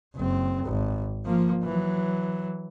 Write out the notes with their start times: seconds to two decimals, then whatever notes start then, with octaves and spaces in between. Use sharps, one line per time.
0.16 F#1 C4
0.65 G#1
1.26 F3 A#3
1.63 E3 F#3